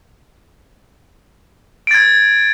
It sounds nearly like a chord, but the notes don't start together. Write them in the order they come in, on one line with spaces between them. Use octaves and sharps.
D7 A6 G#6